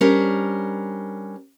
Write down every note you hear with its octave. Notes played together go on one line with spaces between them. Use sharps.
G3 C#4 D4 A#4 C5